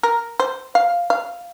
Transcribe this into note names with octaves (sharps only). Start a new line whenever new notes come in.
A#4
C5
F5
F5